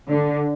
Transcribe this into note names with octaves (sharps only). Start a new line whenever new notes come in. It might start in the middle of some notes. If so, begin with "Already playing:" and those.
D3